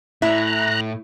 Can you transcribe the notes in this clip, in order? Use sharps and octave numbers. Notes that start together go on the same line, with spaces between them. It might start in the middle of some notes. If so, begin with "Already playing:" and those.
A2 E4 E5 A#5 F#6